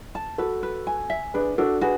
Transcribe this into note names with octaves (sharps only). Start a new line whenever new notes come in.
A5
F#4 A4 B4
B4
G#5
E5
D4 G#4 B4
D4 F#4 A4
F#4 G#4 B4